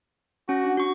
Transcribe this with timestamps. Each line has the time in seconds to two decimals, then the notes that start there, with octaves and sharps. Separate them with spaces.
0.49 C#4 F#4
0.61 D4 F#5
0.77 F#4 C#6